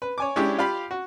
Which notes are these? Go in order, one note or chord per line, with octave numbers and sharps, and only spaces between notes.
B4
C#5 G#5 D6
G#3 C#4 D4 E4 G4
F4 G4 F5 B5
F#4